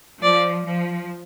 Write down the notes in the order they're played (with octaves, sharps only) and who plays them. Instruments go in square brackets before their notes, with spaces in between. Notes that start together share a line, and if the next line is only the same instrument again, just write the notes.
[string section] F3 [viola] D5
[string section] F3